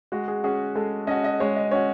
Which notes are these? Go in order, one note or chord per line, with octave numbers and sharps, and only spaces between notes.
G#3 F#4
G#4
C#4 F#4 G#4
G#3 A4
C#4 F#4 D#5
D#5
G#3 C#5
D#5
C#4 F#4 C#5